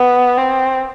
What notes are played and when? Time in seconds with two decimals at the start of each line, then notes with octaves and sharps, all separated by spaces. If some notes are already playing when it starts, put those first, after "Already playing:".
Already playing: B3
0.38 C4